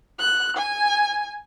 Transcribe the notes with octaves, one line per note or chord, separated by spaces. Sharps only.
F#6
G#5